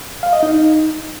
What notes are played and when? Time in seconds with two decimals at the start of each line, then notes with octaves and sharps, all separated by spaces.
0.23 F5
0.33 D#5
0.43 D#4